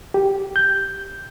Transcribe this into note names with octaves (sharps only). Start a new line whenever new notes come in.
G4
G6